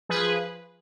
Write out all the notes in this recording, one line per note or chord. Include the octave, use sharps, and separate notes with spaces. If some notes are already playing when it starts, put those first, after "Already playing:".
F3 G#4 B4